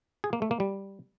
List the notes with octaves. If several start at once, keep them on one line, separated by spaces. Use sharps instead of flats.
G#4
A#3
A3
A#3
G3